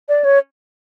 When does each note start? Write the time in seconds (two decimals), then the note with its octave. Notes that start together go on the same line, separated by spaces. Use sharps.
0.09 D5
0.24 C#5